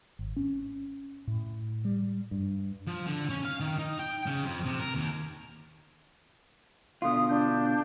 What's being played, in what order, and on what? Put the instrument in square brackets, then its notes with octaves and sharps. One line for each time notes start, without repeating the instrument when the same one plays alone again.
[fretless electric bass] G#1
C#4
A2
G3
G2
[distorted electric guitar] F3
D3
C#4
F5
D#3
D#4
G5
C#3
F2
C3
A#4
D#2
[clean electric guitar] B2 D3 F4 [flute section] D#6
[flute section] D4 G6